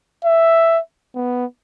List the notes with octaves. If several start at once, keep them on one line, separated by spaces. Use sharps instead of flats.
E5
B3